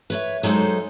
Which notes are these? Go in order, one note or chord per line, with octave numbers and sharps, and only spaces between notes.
B4 C#5 E5
F#3 G#3 D#4 A4 C5